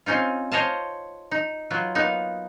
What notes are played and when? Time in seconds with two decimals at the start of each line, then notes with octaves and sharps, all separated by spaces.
0.06 C4 C#4 D#4 F4
0.52 C5 C#5 D#5 F5 A5
1.31 D#4
1.70 F#3 F4 B4
1.95 A#3 B3 D#4